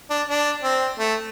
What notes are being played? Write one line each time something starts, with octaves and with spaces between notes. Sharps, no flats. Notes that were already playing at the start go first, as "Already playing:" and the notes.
D4
D4
C4
A3